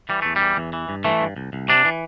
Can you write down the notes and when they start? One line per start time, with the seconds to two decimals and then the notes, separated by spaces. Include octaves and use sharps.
0.09 E3 G3
0.22 E2 A3
0.36 G3
0.41 E3
0.57 E2
0.73 E3
0.89 G2
1.04 E3 A3
1.21 G2
1.36 C2
1.53 C2
1.69 C3 D4
1.85 E3